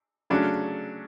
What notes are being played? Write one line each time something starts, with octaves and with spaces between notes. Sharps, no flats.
C#3 F#3 A3 C#4 D4